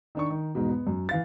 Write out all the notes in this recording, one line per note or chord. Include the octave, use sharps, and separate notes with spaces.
D#3 D4 C#6
D#3
E2 G#2 B2
B3
F#2
E3 F5 A6